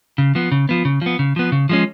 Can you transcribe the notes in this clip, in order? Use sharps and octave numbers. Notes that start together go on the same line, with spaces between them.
C#3
F3 B3
C#3
F3 B3
C#3
F3 B3
C#3
F3 B3
C#3
F3 G#3 C#4